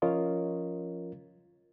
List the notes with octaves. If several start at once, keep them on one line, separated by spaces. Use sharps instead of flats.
F3 C#4 F4 A#4 C#5 D#5